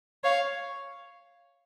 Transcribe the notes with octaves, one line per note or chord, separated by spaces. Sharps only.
C#5 F5